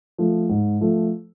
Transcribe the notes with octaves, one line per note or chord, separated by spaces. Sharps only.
F3 A3
G#2
F3 A3